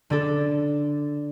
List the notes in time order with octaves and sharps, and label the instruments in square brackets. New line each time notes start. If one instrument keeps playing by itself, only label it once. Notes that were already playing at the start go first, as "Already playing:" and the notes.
[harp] D3 D4 A4